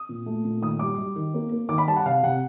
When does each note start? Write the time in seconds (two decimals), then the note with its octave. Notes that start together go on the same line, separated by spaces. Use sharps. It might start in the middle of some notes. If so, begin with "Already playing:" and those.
Already playing: D#6
0.09 A#2
0.26 A3
0.44 A#2
0.62 D#3 D#6
0.79 G3 D6
0.98 G3
1.16 D#3
1.34 A#3
1.52 A#3
1.69 D#3 D6
1.78 B5
1.87 G3 A5
1.96 F#5
2.06 C3 F5
2.23 C3 F#5